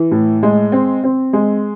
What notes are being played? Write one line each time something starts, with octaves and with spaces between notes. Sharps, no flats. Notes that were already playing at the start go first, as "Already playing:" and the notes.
Already playing: E3
A2
G#3
C4
C4
G#3